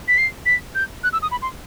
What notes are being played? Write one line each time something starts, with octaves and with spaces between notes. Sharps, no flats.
B6
C7
B6
G6
F#6
E6
D#6
B5
C6